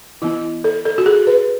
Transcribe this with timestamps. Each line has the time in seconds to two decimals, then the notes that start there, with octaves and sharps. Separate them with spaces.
0.22 E3 B3 E4
0.64 A4
0.85 A4
0.98 F#4
1.06 G#4
1.27 B4